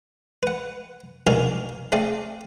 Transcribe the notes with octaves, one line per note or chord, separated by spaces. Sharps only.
B4 F#5
A#1 B2 A#4 D5 F5 G#5
A3 C4 G#4 D5 F5